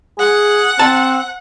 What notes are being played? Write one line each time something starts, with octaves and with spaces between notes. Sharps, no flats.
G#4 F#5
C4 A5